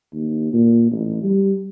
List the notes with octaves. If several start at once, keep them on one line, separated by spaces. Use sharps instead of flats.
D#2
A#2
A1
G3